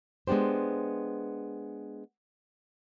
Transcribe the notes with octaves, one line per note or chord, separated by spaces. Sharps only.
G#3 B3 D4 G4 C5